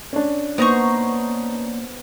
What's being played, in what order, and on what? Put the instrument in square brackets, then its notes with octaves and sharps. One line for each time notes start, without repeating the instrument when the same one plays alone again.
[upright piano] C#4 D4
[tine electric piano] A#3 [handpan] B3 C5 [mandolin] D#4 A#5 C#6